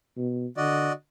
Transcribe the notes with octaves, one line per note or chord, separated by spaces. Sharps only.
B2
D3 F#4 D5 D#5